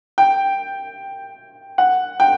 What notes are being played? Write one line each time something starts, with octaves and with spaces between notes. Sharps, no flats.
G5
F#5
G5